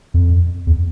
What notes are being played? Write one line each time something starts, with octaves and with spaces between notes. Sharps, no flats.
F2
E2